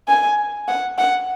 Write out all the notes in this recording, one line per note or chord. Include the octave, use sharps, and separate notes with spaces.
G#5
F#5
F#5